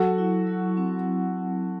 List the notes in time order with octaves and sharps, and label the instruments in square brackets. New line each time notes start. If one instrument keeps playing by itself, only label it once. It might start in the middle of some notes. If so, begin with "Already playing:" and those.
Already playing: [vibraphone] F#3 [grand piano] F#4 A4
[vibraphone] E4
F#3
C4